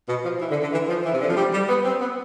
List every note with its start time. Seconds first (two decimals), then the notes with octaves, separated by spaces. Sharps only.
0.08 B2
0.24 F3
0.40 E3
0.50 D3
0.61 D3
0.72 E3
0.88 F3
1.04 E3
1.13 C3
1.21 D3
1.28 F3
1.36 G3
1.53 G3
1.68 B3
1.85 C4
2.01 B3